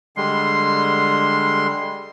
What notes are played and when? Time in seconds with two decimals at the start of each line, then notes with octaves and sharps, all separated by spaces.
0.17 D3 G3 G#3 C6